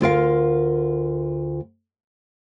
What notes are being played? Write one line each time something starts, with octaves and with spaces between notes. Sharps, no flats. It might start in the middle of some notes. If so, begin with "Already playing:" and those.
D2 F4 A#4 F5